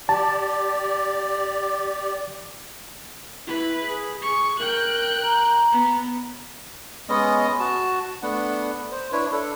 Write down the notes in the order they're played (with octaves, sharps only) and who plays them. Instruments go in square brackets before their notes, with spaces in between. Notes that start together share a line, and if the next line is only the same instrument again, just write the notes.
[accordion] G4 D5 [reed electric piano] A5
[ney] E4 [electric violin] B4
[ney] G#4
[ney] G#4 [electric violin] C#6
[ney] A#4 [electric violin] G5 F#6
[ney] A#5
[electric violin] B3
[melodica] G#3 B3 C#4 D#5
F#4 A5
A3 B3 D4 F#5
C5
D4 E4 B4 C#5
D4 A4